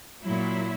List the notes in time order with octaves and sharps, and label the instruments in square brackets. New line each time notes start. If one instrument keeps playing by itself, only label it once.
[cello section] A#2 F#3 E4